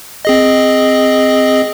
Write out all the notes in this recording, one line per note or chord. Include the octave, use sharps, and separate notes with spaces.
C4 G#4 D#5